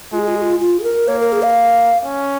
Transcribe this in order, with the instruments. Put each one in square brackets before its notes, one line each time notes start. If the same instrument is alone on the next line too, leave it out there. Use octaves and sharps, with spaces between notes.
[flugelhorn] G#3 [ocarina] F4
[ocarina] G#4
F4
G#4
F4
F4
G#4
A#4
[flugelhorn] A#3 [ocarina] C#5
[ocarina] A#4
G#4
F5
[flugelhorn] C#4